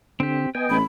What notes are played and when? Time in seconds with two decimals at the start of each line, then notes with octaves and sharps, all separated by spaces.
0.20 D3 C4 G4
0.55 B3 D#5 G5 G#5
0.70 A1 B5